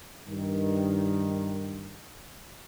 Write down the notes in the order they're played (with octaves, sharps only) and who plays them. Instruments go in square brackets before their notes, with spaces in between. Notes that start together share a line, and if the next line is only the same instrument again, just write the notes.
[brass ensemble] G2 D#3